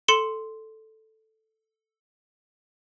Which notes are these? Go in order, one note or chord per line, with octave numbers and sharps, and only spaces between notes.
A4 C6 C#7 E7 G7